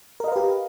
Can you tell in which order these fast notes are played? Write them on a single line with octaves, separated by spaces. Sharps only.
A#4 D#5 F5 B4 G4